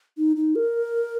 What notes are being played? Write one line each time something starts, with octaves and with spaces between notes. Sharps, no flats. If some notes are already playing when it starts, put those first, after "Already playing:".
D#4
D#4
A#4